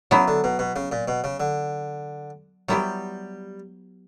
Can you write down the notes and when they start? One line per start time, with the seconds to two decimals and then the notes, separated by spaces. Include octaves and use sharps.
0.11 C#3 F#3 B3 E4
0.28 D3
0.44 B2
0.59 B2
0.76 C#3
0.92 A#2
1.08 B2
1.24 C#3
1.40 D3
2.68 F#3 G3 B3 E4 G4